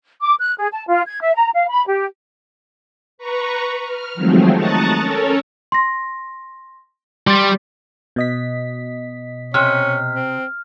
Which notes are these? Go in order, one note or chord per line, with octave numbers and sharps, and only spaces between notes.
D6
F#6
G#4
A5
F4
G#6
E5
A#5
F5
B5
G4
B4 A#5 C#6
F6
D#3 F3 F#3 G#3 A3 C4
A5 A#5 C#6 D#6 F#6 A6
C#4 A4 A#4 C#5
C6 A#6
G3 C6 A6
B2 D#5 B6
C3 C#4 F6
C4